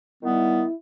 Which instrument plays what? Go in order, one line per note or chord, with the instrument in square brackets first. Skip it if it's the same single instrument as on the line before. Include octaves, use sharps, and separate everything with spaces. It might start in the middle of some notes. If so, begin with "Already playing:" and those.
[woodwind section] D#3 G3 B3 [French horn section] E4